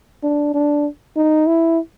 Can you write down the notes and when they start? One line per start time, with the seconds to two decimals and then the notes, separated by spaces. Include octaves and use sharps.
0.23 D4
0.54 D4
1.16 D#4
1.47 E4